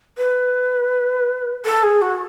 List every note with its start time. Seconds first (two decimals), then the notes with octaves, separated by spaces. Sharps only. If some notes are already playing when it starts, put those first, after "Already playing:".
0.18 B4
1.65 A4
1.83 G#4
2.02 F#4